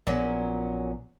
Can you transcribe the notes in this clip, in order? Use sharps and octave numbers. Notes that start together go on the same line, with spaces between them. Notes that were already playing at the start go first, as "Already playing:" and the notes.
A#1 A#2 F#3 B3 C#4